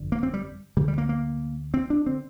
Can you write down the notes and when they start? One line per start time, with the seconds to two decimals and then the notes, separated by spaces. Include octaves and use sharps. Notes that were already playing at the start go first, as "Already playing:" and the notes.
Already playing: G1 F2 D3
0.12 A#3
0.23 C4
0.34 G3
0.77 D3 G3
0.81 D2
0.88 G3
0.98 A#3
1.09 A#3
1.74 C4
1.90 D4
2.06 D3 C4